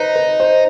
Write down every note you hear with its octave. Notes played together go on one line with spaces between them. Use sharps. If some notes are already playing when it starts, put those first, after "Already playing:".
Already playing: D#4 B4 C5
B4
C5